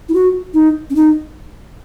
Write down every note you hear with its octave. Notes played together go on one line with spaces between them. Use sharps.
E4
F#4
D#4
C#4
D#4